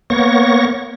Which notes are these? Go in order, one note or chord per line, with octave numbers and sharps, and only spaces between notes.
A#3 B3 C#5 C#6 A#6